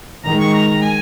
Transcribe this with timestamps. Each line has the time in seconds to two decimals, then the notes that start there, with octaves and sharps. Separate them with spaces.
0.25 D#3 G#3 A#5
0.39 C#6
0.54 A#5
0.67 A#5
0.81 G#5